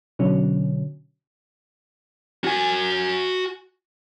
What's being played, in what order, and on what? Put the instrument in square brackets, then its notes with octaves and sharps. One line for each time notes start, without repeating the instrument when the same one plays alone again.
[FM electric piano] B2 D3 F#3 C#4
[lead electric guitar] F#4 G#5